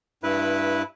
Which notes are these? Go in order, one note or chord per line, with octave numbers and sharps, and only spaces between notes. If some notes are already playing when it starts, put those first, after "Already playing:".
G2 E4 B4